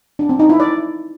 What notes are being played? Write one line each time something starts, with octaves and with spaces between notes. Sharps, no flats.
D4
C4
D#4
E4
D5